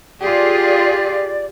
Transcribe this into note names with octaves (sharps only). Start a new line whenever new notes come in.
F4 G4 G#4 D5